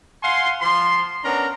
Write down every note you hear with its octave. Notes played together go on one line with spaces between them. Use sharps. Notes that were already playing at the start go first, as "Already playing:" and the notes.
F5 F#5 G#5 C6
F3 C6
B3 C#4 D4 A#4 A#5